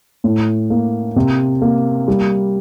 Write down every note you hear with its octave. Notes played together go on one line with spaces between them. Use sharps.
A2
A#3
C3
A#3
G3